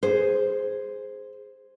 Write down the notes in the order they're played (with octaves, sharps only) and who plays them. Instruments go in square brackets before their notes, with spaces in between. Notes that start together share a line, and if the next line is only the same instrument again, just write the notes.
[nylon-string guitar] G#4 C5